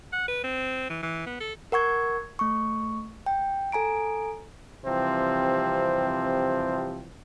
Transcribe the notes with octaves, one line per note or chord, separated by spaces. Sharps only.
F#5
B4
C4
E3
E3
B3
A4
A#4 F#5 C#6 G#6
A3 C#6
G5
A4 G#5 A#5 D7
C3 E3 F3 G3 C4